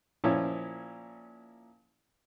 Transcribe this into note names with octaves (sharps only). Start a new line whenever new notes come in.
A#2 F3 C#4 E4